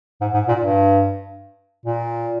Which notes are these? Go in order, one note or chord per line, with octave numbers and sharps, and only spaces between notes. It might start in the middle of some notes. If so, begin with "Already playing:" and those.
G#2
G#2
A#2
G2
A#2